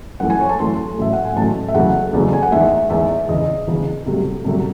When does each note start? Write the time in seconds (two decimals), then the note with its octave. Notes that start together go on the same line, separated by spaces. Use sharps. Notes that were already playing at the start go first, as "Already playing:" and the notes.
0.20 F#2 E3 A3 F#5
0.30 G#5
0.40 C#5
0.49 A5
0.59 F#2 E3 A3 C6
0.97 A1 A2 F#3 A3 E5
1.13 F#5
1.25 G#5
1.36 A1 A2 F#3 A3 A5
1.68 E5
1.74 F#1 E2 C#3 F#3 A3 F#5
2.13 F#1 E2 C#3 F#3 A3
2.33 G#5
2.43 F#5
2.51 E2 D#3 G#3 E5
2.90 E2 D#3 G#3 E5
3.28 E1 E2 C#3 D#5
3.67 E1 E2 C#3
4.06 C2 C3 F#3 A3
4.45 C2 C3 F#3 A3